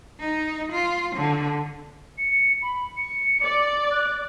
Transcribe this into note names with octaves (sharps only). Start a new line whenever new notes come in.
D#4
F4
D3
C#7
B5
C#7
D5
F#6